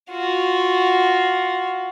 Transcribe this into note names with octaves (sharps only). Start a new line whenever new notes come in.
F4 F#4